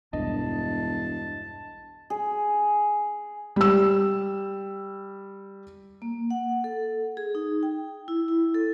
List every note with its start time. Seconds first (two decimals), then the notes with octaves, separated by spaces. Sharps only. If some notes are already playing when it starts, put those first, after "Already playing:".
0.13 E1 B1 E2 G2 D4 D#5 A5
2.10 G#4
3.56 G3 E6
6.02 A#3
6.31 F#5
6.64 A4
7.17 G#4
7.35 D#4
7.63 G5
8.08 E4
8.28 E4
8.55 A4